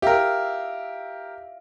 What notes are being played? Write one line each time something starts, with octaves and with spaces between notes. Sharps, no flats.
G4 A#4 E5 F5